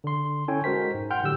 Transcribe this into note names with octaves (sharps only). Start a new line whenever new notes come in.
D3 C6
C#4 E4 A4 C#5 G5 G#5
G#3 F#4 A#4 C5 B6
G#2
F#5 G5 C6 F6 G6
A2 D3 F#3 G4 E6